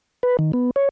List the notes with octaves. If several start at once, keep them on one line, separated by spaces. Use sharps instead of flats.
B4
D#3
B3
C#5